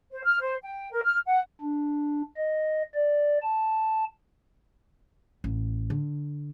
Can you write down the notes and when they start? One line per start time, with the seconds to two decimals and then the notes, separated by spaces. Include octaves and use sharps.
0.11 C5
0.24 F6
0.40 C5
0.63 G5
0.91 A#4
1.03 F6
1.26 F#5
1.61 D4
2.37 D#5
2.94 D5
3.42 A5
5.44 A1
5.90 D3